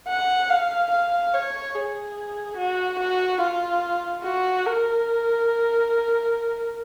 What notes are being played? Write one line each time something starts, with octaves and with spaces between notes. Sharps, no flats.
F#5
F5
F5
C#5
G#4
F#4
F#4
F4
F#4
A#4